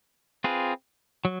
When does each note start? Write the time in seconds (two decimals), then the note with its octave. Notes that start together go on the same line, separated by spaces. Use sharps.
0.44 C4 F4 G#4 B4
1.25 F#3